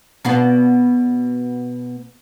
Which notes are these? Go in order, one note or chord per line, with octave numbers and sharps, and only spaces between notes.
B2 B3 D4